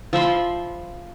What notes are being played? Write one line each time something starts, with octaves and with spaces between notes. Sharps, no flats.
F3 E5 B5 C6